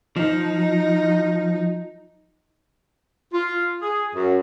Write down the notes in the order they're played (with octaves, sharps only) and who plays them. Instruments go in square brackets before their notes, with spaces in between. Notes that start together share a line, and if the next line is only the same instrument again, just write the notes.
[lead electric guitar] F3 [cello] D#4
[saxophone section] F4
G#4
F#2